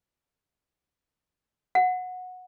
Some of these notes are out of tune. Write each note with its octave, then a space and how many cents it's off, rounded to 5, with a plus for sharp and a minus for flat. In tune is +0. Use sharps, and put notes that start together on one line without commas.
F#5 -15